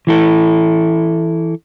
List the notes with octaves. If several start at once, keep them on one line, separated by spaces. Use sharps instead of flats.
E3 E4 A4